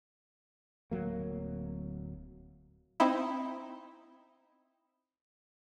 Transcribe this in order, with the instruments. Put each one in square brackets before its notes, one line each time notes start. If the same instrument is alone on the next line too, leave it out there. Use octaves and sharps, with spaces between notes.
[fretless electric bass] D1 F#3 A#3
[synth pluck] C4 D#4 E4